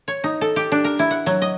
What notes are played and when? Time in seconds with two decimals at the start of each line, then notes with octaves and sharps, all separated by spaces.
0.08 C#5
0.24 D#4
0.41 A4
0.56 G4
0.72 D4
0.84 A#4
0.99 E4
1.11 F#5
1.26 F#3
1.42 D#5